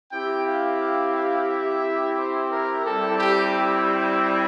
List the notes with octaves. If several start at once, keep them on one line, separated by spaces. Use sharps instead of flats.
C4 E4 G4 G5
F5
F5
F5
E5
C5
A#4
G3 C4 E4 A4
G4